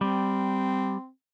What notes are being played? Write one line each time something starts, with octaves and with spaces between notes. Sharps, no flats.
G3 C4